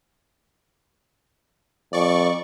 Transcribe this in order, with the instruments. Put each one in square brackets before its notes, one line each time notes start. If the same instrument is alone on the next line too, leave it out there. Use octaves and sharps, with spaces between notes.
[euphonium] F2 [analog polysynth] D5 C#6